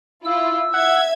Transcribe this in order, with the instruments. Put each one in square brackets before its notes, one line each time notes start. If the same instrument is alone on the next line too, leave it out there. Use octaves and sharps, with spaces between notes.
[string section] E4 F4 [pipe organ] E6
[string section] E5 G#6 [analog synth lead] F#5